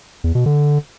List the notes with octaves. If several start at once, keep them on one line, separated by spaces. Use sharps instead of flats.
E2
B2
D3